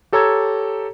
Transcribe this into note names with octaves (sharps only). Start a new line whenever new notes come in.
G4 A4 C#5 A#5 E6 G#6